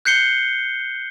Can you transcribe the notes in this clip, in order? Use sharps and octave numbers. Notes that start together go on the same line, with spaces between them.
F#6 G6 C7 C#7 G7